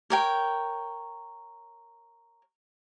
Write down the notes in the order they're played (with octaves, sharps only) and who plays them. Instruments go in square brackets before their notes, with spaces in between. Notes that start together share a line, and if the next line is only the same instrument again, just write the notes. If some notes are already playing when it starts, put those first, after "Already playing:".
[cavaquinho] A#4 C#5 G5